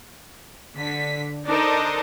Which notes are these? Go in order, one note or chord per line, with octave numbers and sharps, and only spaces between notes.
D3 B6
D4 D#4 A4 A#4 C5 D#5